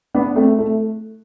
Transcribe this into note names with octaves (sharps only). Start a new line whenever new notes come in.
B3 D4
A3 C4
A3